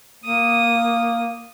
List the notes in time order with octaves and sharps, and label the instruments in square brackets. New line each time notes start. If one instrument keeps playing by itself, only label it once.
[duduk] A#3 [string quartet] D#6